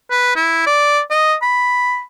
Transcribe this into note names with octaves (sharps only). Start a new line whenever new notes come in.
B4
E4
D5
D#5
B5